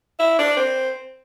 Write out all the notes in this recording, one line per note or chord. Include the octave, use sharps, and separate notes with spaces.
E4
D4
C4